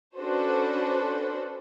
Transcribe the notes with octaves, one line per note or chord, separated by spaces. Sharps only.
C#4 D4 F#4 A4 B4 C5